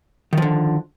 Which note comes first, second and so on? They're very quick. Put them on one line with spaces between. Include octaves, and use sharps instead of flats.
D#3 F3 D3